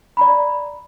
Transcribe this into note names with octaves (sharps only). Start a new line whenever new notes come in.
D5 A#5 B5